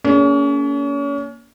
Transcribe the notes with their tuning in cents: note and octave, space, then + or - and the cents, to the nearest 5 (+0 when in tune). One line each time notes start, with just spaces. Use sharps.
A#3 +0 C#4 +35 G#4 +0